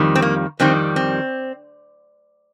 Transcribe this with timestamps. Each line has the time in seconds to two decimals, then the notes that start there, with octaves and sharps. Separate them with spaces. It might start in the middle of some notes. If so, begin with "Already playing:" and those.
Already playing: F2 D#3 G3
0.15 C4
0.22 A#3
0.60 F2 D#3 G3 C4
0.96 C4